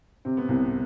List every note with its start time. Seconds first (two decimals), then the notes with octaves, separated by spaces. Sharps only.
0.25 C3 C4
0.37 B3
0.49 C2 C3 C4